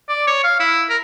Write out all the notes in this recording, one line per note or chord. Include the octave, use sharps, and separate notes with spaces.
D5
C#5
F5
E4
A#4